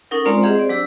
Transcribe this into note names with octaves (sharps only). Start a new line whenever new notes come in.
C#4 D#4 A4 A#4 F#5
G#3 C4 F4 C5 D5 A#5
C4 G4 G#4 D#5 E5 F#5
C5 D5
F#3 D4 G4 E6